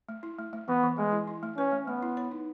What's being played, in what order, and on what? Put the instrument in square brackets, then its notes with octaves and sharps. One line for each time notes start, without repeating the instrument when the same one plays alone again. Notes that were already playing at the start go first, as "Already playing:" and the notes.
[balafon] A3
E4
A3
A3
[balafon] E3 [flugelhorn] B3
[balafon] E3
[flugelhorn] G#3 [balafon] A3
[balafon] E4
E4
A3
[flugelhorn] C#4 [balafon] B4
[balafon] A3
[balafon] A3 [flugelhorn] B3
[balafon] E4
C#5
D#4